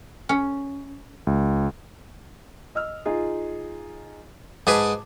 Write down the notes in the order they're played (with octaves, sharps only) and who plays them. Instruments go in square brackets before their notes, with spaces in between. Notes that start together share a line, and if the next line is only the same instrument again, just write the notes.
[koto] C#4
[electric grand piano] C#2
[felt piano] D#5 E6 F6
D#4 F4 G#4
[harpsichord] G#2 G#4 B4 [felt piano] A5 D6